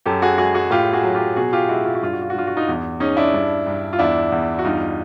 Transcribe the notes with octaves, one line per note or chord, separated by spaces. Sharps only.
F#2 G4 A4
F#4 G#4
G#3 F#4 G#4
F#4 G#4
A2 F4 G4
F#4 G#4
F#3
F4 G4
B2 F#4 G#4
F4 G4
G#3 E4 F#4
F4
F#4
G2 F4
F#4
F4
F#4
G2 F4
F#4
D#4 F4
E2
G#3 C#4 D#4
D4 E4
G2
G2
F4
E2 D4 E4
E2
F#4
G2 D#4 F4